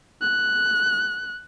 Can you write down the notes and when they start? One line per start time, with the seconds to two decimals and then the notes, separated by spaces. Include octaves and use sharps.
0.22 F#6